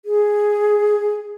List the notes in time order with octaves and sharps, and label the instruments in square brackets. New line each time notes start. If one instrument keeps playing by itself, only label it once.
[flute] G#4